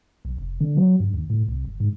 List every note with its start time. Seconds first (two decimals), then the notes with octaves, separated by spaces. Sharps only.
0.25 B1
0.38 F1
0.61 D3
0.77 F#3
1.00 G2
1.14 D#2
1.30 A2
1.48 C2
1.65 G1
1.80 G#2